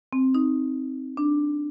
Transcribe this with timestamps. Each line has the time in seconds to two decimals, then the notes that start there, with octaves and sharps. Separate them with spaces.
0.13 C4
0.35 D#4
1.17 D4